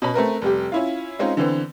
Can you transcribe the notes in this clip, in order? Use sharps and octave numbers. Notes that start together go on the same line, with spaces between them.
B2 C#4 B5
A3 C4 A#4 B4
F1 G3 G4
C#4 E4 F4
G#3 C4 C#4 D#4 F4
D3 E3 B3 C4